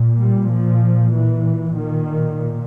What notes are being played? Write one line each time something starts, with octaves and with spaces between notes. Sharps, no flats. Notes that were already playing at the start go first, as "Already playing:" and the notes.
Already playing: A#2
G3
F3
E3
A#2 D#3